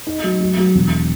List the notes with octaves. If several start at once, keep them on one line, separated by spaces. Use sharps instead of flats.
D#4
F#3
F#3
F#3
E1